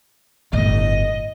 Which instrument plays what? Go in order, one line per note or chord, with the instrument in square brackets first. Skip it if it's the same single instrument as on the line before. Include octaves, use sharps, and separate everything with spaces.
[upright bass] G1 A2 [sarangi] D#5